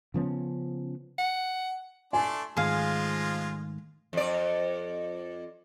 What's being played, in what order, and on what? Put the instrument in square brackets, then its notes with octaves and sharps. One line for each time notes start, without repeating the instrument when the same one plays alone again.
[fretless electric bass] C#3 F3 B3 C#4
[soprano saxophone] F#5
[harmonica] A3 D4 C6 [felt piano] G#5
[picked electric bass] G#2 D#3 A3 [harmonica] F3 G#3 F4 [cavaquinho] G#4 F5
[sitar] F2 D5